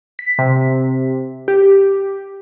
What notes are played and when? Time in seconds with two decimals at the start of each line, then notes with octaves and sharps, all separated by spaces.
0.19 B6
0.39 C3
1.48 G4